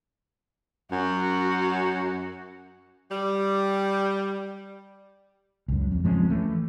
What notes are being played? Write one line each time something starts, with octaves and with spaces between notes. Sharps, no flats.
F#2 F#4
G3
C#2 F#2
F2
F3 G#3 C4 C#4
E3 A3